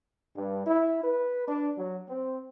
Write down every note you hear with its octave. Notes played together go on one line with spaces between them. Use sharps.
G2
E4
B4
D4
F#3
C4